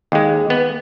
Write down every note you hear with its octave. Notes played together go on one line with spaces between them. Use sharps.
D#2 G#3
B3